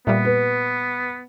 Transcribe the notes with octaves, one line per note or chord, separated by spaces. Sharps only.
A#2 G3 B3 E5
B4